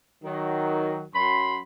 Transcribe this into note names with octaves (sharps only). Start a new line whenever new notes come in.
D#3 F#3
F#2 B5 C6